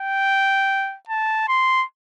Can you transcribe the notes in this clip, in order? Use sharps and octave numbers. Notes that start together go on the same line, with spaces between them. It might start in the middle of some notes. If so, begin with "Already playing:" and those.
Already playing: G5
A5
C6